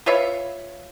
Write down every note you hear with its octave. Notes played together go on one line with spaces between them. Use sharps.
F4 B4 C#5 E5